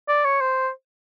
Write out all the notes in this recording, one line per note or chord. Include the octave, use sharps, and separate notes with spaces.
D5
C#5
C5